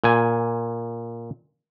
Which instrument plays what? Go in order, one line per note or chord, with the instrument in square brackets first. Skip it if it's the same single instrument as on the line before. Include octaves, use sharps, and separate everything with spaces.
[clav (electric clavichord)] A#2 G#5